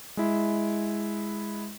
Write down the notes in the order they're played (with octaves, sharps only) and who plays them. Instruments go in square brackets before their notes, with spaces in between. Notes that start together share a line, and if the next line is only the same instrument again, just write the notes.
[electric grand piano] G#3 E4